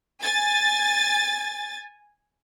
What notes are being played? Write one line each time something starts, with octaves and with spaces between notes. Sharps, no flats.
G#5 A6